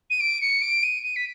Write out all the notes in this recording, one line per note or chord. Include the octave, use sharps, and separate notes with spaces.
D#7
D7
C#7
D7
D#7
D#7
B6